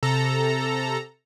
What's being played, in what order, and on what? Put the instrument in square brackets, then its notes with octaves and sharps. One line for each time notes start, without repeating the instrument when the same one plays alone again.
[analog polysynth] C3 A4 A#5